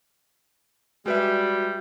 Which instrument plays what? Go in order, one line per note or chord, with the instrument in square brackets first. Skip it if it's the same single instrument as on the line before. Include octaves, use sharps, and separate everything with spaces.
[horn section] G3 [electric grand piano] G#3 B4 E5 [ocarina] F#4